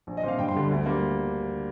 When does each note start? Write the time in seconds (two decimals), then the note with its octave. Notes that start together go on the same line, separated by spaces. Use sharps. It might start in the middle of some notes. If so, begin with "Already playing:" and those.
0.07 A#1
0.17 D#5
0.23 A#2 F3 C4 F5
0.39 G2 G5
0.48 C6
0.55 D3 G3
0.71 D2
0.86 G3 A#3